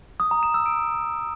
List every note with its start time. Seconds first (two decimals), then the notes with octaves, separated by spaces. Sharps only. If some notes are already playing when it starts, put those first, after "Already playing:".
0.20 D#6
0.31 A#5
0.43 E7
0.54 E6
0.66 D7